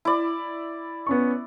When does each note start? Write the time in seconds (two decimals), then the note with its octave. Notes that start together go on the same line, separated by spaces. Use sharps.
0.05 E4 D5
1.07 B3 C#4 C#6